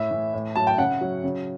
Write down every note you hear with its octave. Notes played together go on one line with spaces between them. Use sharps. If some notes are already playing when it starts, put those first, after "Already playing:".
Already playing: A2 E5
E3
A2
F#3 A5
G5
C#3 F#5
F#3
C#3